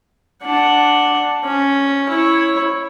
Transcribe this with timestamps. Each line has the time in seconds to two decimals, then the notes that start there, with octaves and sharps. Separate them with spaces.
0.43 D4 F#5
1.44 C#4
2.09 E4 C#5